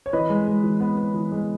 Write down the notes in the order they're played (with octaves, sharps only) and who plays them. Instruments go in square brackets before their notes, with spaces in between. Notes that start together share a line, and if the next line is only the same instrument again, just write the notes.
[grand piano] C#5
E3 B4 D#5
G#3
G#3
E3
B3
B3
E3
G#3